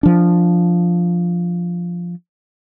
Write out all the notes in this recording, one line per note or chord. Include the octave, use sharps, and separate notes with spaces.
F3 D4